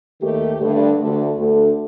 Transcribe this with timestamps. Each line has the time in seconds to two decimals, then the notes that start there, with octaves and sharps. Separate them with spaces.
0.21 D#2 D#3 A3 G4
0.61 G2 D3 A3
0.99 D2 D3 A3
1.38 D2 D3 A3